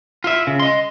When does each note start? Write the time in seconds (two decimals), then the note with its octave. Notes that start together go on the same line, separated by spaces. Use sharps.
0.24 F4 E5
0.47 C#3
0.60 D#5 C6